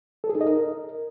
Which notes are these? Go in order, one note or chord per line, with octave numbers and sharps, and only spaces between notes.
A4
G#4
D#4
D#5
A#4